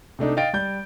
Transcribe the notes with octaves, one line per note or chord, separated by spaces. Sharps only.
C3 A3 D4 D#4
D#5 F5 G5 A6 D7
G3 G6